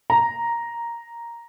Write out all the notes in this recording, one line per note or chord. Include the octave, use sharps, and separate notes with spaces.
A#5